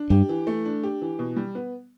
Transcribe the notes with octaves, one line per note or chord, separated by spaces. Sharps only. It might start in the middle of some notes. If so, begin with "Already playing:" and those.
Already playing: D4
G2 G4
E3
A3
D4
G4
E3
B2
G3
B3